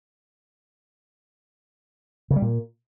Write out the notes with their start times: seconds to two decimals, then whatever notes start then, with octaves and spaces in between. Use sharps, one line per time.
2.31 C#3
2.36 G3
2.42 A#2